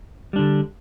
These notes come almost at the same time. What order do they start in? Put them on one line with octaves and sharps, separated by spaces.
G3 D4 D3